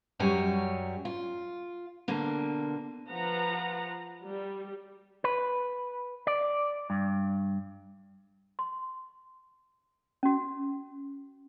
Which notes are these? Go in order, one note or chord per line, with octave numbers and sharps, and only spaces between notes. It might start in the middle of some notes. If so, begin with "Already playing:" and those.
F#2 F#3 G3 C#5 G#5
F4
B2 D3 A#3
F3 B4 F#5 A#5
G3
B4
D5
G2
C6
C#4 F#4